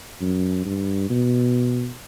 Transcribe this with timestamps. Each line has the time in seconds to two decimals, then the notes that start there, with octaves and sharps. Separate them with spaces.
0.20 F#2
0.65 G2
1.10 B2